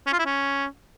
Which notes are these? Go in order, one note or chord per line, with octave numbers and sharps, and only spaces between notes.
C#4
F4
E4
C#4